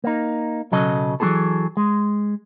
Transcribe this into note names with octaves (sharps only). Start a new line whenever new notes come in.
A#3 D#4
B1 C#3 F#3 A4 D#5
E3 F#3 C4 D#4 G#4 A4
G#3